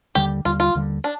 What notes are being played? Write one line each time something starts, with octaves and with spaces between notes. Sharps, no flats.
D#2 D3 G3 G4
D#2 D3 G3 F4
F4
D#2 D3 G3
D4